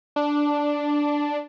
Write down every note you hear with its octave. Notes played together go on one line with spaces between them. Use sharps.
D4